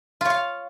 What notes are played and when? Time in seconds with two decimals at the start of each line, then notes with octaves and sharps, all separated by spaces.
0.21 F4
0.25 C#5
0.30 F5